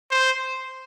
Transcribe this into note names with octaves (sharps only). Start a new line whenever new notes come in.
C5